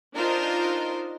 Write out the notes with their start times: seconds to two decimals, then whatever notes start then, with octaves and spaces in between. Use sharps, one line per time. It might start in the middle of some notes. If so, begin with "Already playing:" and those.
0.16 D4 D#4 F4 A#4 C5 D#5